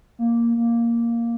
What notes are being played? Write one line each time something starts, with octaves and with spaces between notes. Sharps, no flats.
A#3
A#3